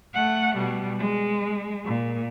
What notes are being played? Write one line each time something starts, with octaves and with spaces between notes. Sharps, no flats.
A3 F#5
B2 G3
G#3
A#2